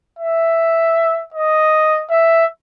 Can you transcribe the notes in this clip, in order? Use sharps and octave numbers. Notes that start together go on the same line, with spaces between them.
E5
D#5
E5